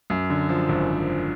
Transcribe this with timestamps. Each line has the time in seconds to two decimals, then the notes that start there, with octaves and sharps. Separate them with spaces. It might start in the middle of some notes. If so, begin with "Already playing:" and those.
0.10 F#2
0.30 D3
0.49 F3
0.69 G#1